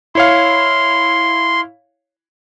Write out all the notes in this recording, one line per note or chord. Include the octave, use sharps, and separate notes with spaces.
E4 C#5 F5 C6